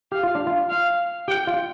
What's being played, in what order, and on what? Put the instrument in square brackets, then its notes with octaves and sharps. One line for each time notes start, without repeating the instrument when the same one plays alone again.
[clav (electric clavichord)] G4 [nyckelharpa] F5
[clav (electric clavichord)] F4
D4
F4
[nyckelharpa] F5
[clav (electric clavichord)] G4 [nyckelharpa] G5
[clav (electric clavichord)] F4